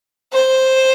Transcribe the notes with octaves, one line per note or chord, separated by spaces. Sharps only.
C5